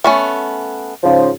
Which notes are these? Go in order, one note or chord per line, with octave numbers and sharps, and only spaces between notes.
A3 B3 C#4
G#2 C#3 F3